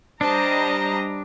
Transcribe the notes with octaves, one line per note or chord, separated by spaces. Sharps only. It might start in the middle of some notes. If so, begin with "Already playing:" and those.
G3 D4 C5 D#5 A5 A#5